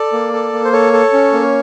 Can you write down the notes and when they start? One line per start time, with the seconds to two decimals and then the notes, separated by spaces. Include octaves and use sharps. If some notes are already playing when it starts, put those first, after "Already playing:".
Already playing: A4 D5
0.13 A#3
0.33 A4
0.53 A#3
0.65 C5
0.72 A4 C#5
0.93 A4
1.13 C#4
1.33 A#3